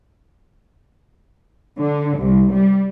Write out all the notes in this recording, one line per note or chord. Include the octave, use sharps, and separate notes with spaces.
D3
C2
G3